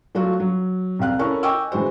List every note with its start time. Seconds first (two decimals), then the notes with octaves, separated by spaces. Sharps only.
0.15 F#3 A3 F4 F#4
0.40 F#3
0.99 C2 F2 F5 F#6
1.19 C#4 E4 A4 A#4 C#6
1.43 D#5 G5 G#5 C#6 D6 E6
1.72 E3 G#3 F#4 C5